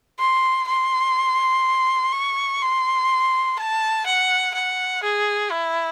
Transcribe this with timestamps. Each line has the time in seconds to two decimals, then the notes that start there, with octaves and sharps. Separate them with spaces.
0.19 C6
0.68 C6
2.12 C#6
2.61 C6
3.58 A5
4.06 F#5
4.54 F#5
5.03 G#4
5.51 E4